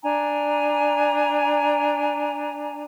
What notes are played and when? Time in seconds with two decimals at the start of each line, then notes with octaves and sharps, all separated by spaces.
0.02 D4 G#5 A#5